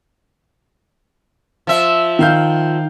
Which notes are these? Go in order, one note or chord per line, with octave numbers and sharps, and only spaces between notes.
F3 E5
D#3 F5 G6